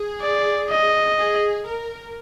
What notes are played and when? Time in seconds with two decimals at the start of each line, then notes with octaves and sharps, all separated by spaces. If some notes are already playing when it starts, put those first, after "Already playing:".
Already playing: G#4
0.21 D5
0.70 D#5
1.18 G#4
1.67 A#4